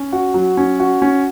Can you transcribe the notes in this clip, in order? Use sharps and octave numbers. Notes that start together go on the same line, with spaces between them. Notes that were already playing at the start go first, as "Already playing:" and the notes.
Already playing: C#4
F#4
F#3
C#4
F#4
C#4